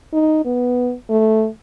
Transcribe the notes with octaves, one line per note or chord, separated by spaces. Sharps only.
D#4
B3
A3